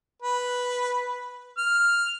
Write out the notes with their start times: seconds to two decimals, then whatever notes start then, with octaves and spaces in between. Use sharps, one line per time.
0.22 B4
1.58 F6